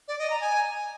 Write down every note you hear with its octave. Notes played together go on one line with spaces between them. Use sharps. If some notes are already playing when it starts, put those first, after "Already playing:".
D5
D#5
A#5
G#5